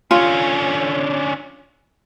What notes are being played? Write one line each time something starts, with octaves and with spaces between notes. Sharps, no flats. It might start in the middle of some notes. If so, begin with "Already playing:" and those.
D3 C#4 F4